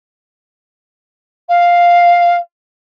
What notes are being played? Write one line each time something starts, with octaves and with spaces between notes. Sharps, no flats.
F5